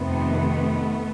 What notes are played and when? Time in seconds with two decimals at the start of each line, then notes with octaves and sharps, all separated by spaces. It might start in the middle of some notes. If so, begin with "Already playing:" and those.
Already playing: F2 C3 D#3 A3 B3